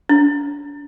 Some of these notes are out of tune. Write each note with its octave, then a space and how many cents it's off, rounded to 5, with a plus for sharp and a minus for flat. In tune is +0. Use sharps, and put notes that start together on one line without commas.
D4 -35